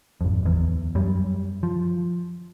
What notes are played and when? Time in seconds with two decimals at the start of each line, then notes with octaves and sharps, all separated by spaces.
0.21 G#1 F2
0.43 D1 E2
0.95 F#2 G3
1.63 F3